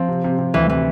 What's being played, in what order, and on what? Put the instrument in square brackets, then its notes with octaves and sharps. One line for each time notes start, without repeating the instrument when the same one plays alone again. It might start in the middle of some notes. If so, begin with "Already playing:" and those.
Already playing: [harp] F3 [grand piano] C4
[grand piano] C3
C3
C3
[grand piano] D2 [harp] E3
[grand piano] C3 [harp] E3